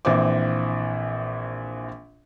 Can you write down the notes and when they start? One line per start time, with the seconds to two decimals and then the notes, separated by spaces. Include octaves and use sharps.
0.05 A#1 E3 C4 D6